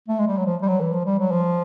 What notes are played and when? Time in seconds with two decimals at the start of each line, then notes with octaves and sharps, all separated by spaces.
0.09 A3
0.19 G#3
0.28 G3
0.37 F#3
0.46 F3
0.62 G3
0.68 F#3
0.80 E3
0.93 F3
1.05 G3
1.19 F#3
1.32 F3